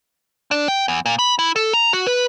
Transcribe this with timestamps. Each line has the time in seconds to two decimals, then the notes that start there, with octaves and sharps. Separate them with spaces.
0.51 D4
0.68 G5
0.88 E2
1.06 A#2
1.19 B5
1.39 E4
1.56 A4
1.73 A#5
1.93 F#4
2.07 B4